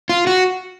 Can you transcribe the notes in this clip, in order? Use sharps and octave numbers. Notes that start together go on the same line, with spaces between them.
F4
F#4